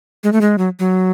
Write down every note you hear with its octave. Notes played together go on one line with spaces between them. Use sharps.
G#3
A3
G#3
F#3
F#3